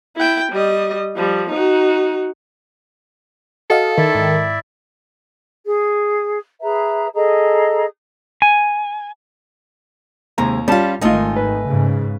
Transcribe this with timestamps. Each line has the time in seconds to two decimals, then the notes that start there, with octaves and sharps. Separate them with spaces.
0.17 E4 G5
0.52 G3 D#5
1.16 F3 G3
1.50 D#4 F#4
3.70 F#4 A4 D#5 F5
3.97 D#3 E4 D5 E5
4.15 G#2
5.65 G#4
6.61 G#4 B4 E5 A#5
7.13 G#4 A4 D#5 A#5
8.42 G#5
10.38 D#2 C3 D#3 G#3 A#5
10.68 G3 C#4 F4 A5
11.01 G#1 D#3 A3 D#4 F4 D#5 G#5
11.36 B4
11.67 G#2 C#3